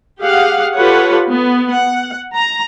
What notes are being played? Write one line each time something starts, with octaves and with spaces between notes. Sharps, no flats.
G4 G#4 F5 F#5
F4 G4 A4 B4 C#5 F#5
B3
F#5
A#5